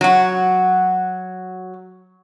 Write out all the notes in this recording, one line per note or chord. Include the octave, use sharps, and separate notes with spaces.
F#3 F#4